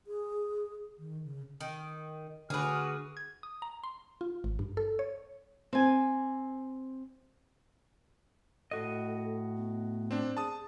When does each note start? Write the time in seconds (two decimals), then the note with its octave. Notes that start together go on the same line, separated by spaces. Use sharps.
0.07 G#4
0.99 D#3
1.24 C#3
1.61 D#3
2.50 D3 F#4 G#4 B4 D6 D#6 F6
3.17 G#6
3.43 D#6
3.62 A#5
3.84 C6
4.21 F4
4.44 G#1
4.59 G2
4.77 A4
4.99 C#5
5.73 C4 G#5
8.71 A2 F#4 A4 D#5
9.57 B3
10.11 C4 D4
10.37 G#4 A5 D#6